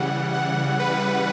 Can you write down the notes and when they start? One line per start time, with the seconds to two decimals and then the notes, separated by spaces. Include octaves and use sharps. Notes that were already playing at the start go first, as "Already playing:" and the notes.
Already playing: C#3 E3 G3 F#5
0.33 F#5
0.79 B4